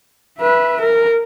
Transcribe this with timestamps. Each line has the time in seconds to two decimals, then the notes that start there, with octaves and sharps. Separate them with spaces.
0.39 B4 E5
0.81 A#4